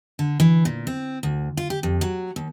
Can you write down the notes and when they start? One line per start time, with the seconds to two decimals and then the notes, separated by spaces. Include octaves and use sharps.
0.19 D3
0.40 E3
0.65 A#2
0.87 C4
1.23 D2
1.57 F4
1.70 G4
1.83 F2
2.01 F#3
2.36 D#2